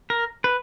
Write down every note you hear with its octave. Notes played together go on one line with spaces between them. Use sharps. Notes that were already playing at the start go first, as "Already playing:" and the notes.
A#4
B4